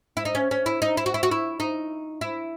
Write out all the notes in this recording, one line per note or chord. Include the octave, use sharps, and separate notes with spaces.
E4
D#4
C#4
C#4
E4
D#4
E4
F#4
E4
F#4
E4
D#4
E4